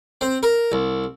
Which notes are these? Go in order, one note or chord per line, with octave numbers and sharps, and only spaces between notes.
C4
A#4
C2